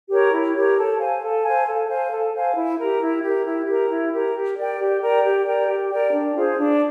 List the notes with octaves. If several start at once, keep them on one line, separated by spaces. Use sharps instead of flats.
G4 A#4 C#5
E4
G4 A#4 C#5
A4
C5 F5 G#5
A4
C5 F5 G#5
A4
C5 F5 G#5
A4
C5 F5 G#5
E4
G4 A#4
E4
G4 A#4
E4
G4 A#4
E4
G4 A#4
G4
A#4 D5 G5
G4
A#4 D5 G5
G4
A#4 D5 G5
G4
A#4 D5 G5
D4
F4 G#4 C5
D4